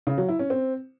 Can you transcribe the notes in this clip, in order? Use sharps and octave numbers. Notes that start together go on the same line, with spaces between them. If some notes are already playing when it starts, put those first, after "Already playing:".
C#3
F#3
E4
C#4
C4